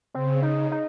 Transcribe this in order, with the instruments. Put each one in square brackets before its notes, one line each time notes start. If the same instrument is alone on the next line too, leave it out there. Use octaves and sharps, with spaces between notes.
[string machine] C#3 [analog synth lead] C4
[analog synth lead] D#4
D#4